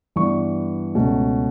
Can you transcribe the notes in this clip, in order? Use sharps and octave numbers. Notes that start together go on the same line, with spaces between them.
G2 E3 B3 C#6
C#2 B2 A3 C#4